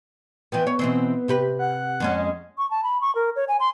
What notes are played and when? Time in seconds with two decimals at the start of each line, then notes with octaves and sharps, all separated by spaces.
0.52 E3 F3 B3 G5
0.67 B3 C#5
0.79 B2 E3 C4
1.28 C3 G4 B4
1.59 F#5
2.00 F2 G#3 C#4
2.58 C#6
2.71 A5
2.84 B5
3.01 C#6
3.15 A#4
3.36 C#5
3.48 G#5
3.60 C6